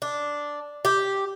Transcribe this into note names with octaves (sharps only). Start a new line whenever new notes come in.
D4
G4